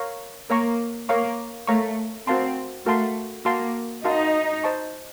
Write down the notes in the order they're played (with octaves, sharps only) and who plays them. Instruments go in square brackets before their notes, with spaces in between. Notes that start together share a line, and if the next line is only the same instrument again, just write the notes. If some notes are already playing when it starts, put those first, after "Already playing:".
Already playing: [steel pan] A#4 C#5 F5 A#5 C#6
[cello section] A#3 [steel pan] A#4 C#5 F5 A#5 C#6
[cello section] A#3 [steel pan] A#4 C#5 F5 A#5 C#6
[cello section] A3 [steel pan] A#4 C#5 F5 A#5 C#6
[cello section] C4 [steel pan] F#4 A#4 F5 A5 C6
[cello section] A3 [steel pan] F#4 A#4 F5 A5 C6
[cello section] A#3 [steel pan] F#4 A#4 F5 A5 C6
[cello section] D#4 [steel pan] F#4 A#4 F5 A5 C6
[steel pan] C5 D#5 A5 C#6